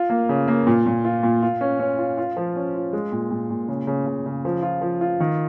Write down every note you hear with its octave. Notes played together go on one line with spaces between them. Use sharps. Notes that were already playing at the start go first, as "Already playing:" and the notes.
Already playing: F4
A#3
C#3
A#3
A#2
A#2
F4
A#2
F4
C#4
C#4
F4
F4
F3
C#4
F4
G#3
A#2
A#2
A#2
C#3
C#3
C#3
C#3
F3
F4
F3
F4
D#3